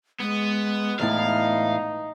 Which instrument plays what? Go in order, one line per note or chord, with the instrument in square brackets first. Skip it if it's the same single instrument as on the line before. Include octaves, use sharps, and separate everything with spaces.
[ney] G#3 [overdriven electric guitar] B3
[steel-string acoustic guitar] E2 A2 E4 [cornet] D#4 [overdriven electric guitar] F5